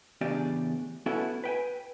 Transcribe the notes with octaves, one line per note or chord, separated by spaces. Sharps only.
E2 A2 C#3 D4 G4 D5
B3 C#4 E4 F#4 A4
B4 G5 G#5